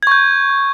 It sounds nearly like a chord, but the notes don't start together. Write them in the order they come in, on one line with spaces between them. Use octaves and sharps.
G#6 C#6 G6